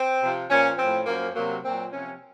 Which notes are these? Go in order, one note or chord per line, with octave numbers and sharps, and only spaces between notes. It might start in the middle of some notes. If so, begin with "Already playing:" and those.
Already playing: C4
C3 F3
A#2 F3 C#4
A2 F3 C4
F#2 F3 A#3
C3 F#3 A#3
A#2 F#3 C4
C3 F3 C#4